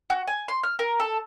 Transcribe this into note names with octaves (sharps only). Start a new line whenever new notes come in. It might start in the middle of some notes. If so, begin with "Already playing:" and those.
F#4
G#5
C6
F6
A#4
A4